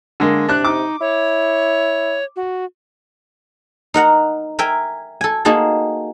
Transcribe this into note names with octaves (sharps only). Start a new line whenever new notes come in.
D3 G#3 A#3
C3 D4 F#6
D#4 D6
E4 C#5
F#4
D#4 A#4 F#5 A#5
A#4 E5 G5 G#5
A4 G#5
A#3 D#4 F#4 G#4 A5